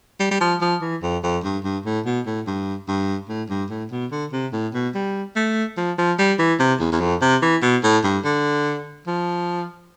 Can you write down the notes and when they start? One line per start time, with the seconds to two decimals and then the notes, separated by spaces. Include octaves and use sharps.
0.20 G3
0.31 G3
0.41 F3
0.61 F3
0.81 E3
1.02 F2
1.23 F2
1.44 G2
1.64 G2
1.85 A2
2.06 B2
2.26 A2
2.47 G2
2.88 G2
3.29 A2
3.50 G2
3.70 A2
3.91 B2
4.11 D3
4.32 C3
4.53 A2
4.74 B2
4.94 G3
5.36 A3
5.77 F3
5.98 F3
6.18 G3
6.39 E3
6.59 C3
6.80 E2
6.92 E2
7.00 F2
7.21 C3
7.42 E3
7.62 B2
7.83 A2
8.04 G2
8.25 D3
9.07 F3